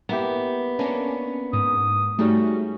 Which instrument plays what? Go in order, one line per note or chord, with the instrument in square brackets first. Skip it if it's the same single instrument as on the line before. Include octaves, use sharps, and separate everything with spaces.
[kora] A#3 E4 G4 [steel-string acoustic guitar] B3
[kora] A#3 D4 [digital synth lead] C#4
[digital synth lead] G#2 [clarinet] D#6
[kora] G#2 G3 C#4 [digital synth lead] A3 [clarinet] F#4